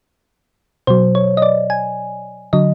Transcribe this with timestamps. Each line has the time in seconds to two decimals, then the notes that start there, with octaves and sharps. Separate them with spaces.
0.87 B2 F#3 C5
1.15 C#5
1.37 D#5
1.42 D5
1.70 G#5
2.53 D3 F#3 D#5